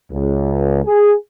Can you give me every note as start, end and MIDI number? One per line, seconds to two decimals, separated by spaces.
0.13 0.83 37
0.85 1.13 68